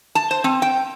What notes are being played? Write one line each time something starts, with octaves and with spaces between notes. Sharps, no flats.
A5
C5
C4
G5